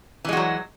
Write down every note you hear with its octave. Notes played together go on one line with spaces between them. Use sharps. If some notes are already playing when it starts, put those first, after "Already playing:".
E3 F#3 G#3 F#4